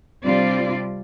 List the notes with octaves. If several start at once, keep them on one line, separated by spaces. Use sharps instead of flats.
C3 G3 C4 D4 F4 D5